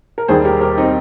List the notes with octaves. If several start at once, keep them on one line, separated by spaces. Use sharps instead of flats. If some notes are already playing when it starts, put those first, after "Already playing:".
A#4
D#2 D#3 G3 G#4 C5
G4 A#4
G4 A#4
C4 D#4